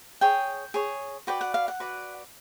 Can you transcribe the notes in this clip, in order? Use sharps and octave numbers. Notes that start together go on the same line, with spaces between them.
G#4 C#5 G5
G#4 C#5
F#4 B4 D5 G5
F#5
F5
F#5
F#4 B4 D5